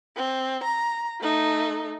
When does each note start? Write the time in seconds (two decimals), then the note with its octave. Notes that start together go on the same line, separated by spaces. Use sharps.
0.17 C4
0.64 A#5
1.21 A3 D#4